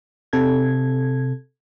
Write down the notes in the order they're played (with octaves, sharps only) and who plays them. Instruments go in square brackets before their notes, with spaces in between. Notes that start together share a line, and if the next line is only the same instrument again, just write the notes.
[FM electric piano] C3 A4 G#6